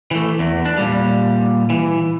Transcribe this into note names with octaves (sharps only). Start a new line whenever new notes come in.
E3 A3
E2
D4
A#2 G3
E3